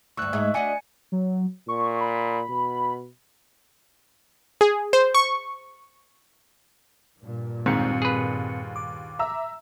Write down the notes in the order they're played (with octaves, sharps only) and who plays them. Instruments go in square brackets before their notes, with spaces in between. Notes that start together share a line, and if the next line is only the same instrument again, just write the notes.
[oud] D2 G2 [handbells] C#6 E6 F#6
[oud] G#2 G#3 [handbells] E5
[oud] D4 F#4 D#5 [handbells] D5 G#5 C#7
[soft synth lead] F#3
[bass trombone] A#2 [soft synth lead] C#6
[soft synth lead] B5
[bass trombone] B2
[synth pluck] G#4
C5
C#6
[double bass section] G2 A#2
[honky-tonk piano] D#2 [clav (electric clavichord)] G#2 [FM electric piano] C4 C#7
[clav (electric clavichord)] G#4 B4
[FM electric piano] D6
[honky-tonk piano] E5 A#5 E6